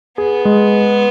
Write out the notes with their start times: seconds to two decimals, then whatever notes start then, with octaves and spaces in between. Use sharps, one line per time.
0.18 B3 G#4
0.45 G#3